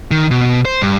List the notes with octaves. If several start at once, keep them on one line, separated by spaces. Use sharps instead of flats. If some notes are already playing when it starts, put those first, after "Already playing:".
D#3
B2
C5
G2